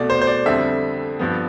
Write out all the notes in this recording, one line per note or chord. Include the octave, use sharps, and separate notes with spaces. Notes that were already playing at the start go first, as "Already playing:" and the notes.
Already playing: C2 B2 A3 D5
C5
C5
D5
F2 D3 G3 C4 E5
G2 F3 B3